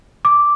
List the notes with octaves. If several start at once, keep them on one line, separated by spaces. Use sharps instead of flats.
D6